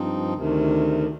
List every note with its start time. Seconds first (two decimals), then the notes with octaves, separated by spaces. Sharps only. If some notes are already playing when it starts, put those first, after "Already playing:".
Already playing: G2 F3 C4 D#4
0.33 D2 C3 D#3